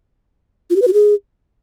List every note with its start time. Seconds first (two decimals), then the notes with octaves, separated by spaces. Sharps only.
0.70 F4
0.76 G4
0.82 B4
0.88 F#4
0.93 G#4